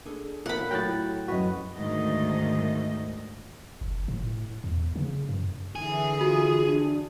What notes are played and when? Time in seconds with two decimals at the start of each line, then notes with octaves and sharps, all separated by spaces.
0.05 D4 G#4 A4
0.46 A#2 D#4 F4 A#4 F#5 B5
0.71 A2 F#3 G4 G5 F#6 A6
1.00 F#4
1.28 F#2 F#4 B4 C#5 D#5
1.75 D2 G#2 D#3 A3 D#5
3.81 F#1
4.08 A2
4.64 E2
4.96 C#3
5.29 F#2
5.76 D3 E3 G#4
6.21 F4 F#4
6.66 D4